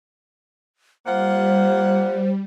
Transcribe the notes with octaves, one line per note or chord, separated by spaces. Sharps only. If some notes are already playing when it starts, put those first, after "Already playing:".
G3 A#3 F4 C5 F#5